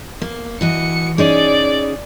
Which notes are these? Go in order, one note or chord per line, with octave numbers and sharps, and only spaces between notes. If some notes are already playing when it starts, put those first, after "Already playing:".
A#3
E3 F#4 D#5 C#7
C#4 D#4 G#4 D5